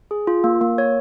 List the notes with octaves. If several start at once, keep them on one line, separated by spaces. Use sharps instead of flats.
G#4
F4
A#3
A#3
C#5